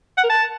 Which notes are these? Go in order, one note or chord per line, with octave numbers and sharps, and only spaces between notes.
F#5
A#4
A5